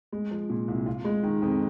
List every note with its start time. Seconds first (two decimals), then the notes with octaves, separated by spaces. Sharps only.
0.12 G#3
0.31 F3
0.50 A#2
0.68 C2
0.86 F4
1.05 G#3
1.23 D#3
1.42 F2